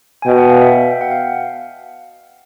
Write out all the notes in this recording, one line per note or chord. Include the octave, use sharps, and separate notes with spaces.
G#5
B2 G5
F#5
F5
E5
G5
F#5
F5